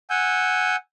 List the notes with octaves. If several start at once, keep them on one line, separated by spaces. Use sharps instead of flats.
F#5 G#5 E6 G6